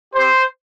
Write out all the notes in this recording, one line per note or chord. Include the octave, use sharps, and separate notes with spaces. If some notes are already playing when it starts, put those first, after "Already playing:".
C4 G4 C5